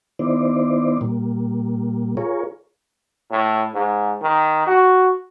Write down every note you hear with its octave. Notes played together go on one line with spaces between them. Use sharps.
D#3 B3 D#4 E4 C5 D5
A#2 G3 A#3
F4 G#4 A#4 C#5
A2
G#2
D#3
F#4